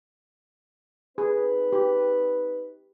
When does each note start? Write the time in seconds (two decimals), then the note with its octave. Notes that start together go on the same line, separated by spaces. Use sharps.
1.18 C4 D#4 G#4 B4
1.73 G4